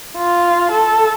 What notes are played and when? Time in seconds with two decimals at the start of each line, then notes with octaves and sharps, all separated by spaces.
0.17 F4
0.71 A4